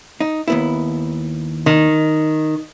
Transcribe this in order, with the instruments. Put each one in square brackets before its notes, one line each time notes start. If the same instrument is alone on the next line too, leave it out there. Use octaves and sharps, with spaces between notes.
[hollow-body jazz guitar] D#4
D#2 B3 E4
[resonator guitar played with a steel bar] D#3